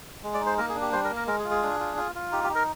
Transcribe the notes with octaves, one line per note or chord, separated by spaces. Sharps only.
G#3
D5
D#4
C5
A#3 A#4
G#4
D4
G4
G3 C5
A#4
A#3
A#4
G#3 A#4
G#4
F4
G#4
D4
F4
F4
F4
D#4 G4
G4
D#4
A#4